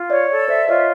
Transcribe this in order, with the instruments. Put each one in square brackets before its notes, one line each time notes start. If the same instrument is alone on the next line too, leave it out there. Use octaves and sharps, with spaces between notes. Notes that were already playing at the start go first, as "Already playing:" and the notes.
Already playing: [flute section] F4
[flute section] C#5 [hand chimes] D5 E5
[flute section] A4
[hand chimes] C5 D5 [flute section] E5
[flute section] F4 [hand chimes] C#5 D#5